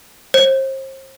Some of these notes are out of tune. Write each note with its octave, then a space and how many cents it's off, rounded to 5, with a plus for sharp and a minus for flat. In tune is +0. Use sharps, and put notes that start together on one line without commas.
C5 +35